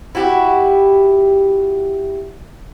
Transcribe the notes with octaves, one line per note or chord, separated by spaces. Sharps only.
E4 F#4 G4